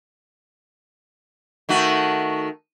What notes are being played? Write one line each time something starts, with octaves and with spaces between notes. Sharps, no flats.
D#3 A3 F#4